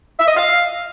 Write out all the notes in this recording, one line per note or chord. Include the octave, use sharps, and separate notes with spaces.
E5
D#5
F5